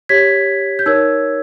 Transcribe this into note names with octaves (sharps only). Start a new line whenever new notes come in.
G4 C#5 G#6 B6
G6
D#4 A#4 C#5 E6 G#6